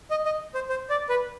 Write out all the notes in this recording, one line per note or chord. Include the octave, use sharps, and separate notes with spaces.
D#5
D#5
C5
C5
D5
B4